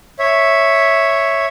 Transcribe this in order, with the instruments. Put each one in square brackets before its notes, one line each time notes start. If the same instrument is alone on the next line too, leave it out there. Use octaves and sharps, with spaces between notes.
[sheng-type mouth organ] C#5 E5